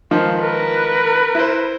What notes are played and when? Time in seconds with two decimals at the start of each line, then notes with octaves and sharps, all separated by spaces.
0.11 C#2 D#3 F3 C5 F5
0.39 A#4 B4
1.35 E4 C5